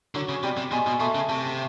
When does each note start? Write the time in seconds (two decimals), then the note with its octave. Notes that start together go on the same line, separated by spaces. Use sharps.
0.15 D3 F#3
0.29 C#3
0.43 C3 G3
0.57 C3
0.72 B2 G#3
0.87 B2
1.00 B2 A3
1.15 C#3
1.29 C3 A3